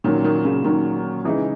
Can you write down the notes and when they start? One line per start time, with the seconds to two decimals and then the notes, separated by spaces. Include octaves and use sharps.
0.04 A#2 D#3 F#3 C#4
0.24 D#3
0.45 C#3
0.64 A#2 D#3 F#3 C#4
1.24 C#3 E3 G#3 D#4